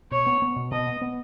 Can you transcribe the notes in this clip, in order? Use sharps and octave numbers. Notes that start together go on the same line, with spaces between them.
B2 C#5
B3
B3
B2
B2 D#5
B3
B3